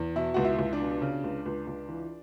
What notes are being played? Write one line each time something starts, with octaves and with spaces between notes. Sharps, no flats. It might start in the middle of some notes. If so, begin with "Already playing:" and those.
Already playing: E2
B2 E4
C#2 F#4
E4
C#2
D4
B2
C#3
C#2
C#2
C#2
E3